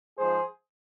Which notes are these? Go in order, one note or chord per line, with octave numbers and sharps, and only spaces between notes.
G#2 F3 G#4 C5